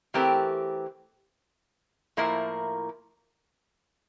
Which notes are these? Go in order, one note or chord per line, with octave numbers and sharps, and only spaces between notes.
E3 A3 C4 G4 A#4
A2 F3 A#3 E4 A#4